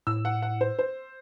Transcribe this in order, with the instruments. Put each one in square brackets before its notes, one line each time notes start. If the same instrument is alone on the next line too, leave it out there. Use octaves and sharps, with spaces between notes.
[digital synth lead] A2 [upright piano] E6
[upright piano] F#5
F#5
C5
C5